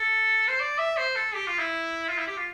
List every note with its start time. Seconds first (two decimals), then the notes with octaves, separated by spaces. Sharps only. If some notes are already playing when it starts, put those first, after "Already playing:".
Already playing: A4
0.48 C5
0.60 D5
0.78 E5
0.97 C5
1.16 A4
1.34 G4
1.47 F4
1.59 E4
2.09 F4
2.18 E4
2.28 G4
2.37 F4